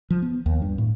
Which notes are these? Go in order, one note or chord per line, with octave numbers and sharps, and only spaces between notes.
F3
B3
D#2
G2
A2